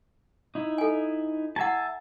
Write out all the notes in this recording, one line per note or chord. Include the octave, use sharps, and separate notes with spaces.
D#4 E4
A4 G#5
E4 E5 F#5 G#5 A5